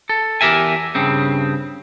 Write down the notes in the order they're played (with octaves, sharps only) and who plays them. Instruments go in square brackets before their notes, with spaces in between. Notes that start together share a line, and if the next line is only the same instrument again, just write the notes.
[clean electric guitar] A4
E2 G4 A#4 E5 G#5
G2 C#3 C4